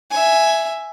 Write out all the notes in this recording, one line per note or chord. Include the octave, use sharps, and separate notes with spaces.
E5 G#5